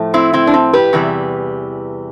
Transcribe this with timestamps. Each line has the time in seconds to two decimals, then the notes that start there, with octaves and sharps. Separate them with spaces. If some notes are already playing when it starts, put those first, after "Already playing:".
Already playing: A2 F3 A3
0.14 C4 E4
0.33 C4 E4
0.47 D4
0.54 C4
0.73 G4 B4
0.93 E2 C3 E3 G3